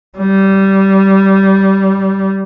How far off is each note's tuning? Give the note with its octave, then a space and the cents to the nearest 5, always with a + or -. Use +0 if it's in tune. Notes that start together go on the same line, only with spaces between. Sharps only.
G3 -15